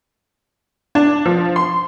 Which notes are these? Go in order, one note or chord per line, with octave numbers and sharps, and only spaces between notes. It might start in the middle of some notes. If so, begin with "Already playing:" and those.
D4
F3
C6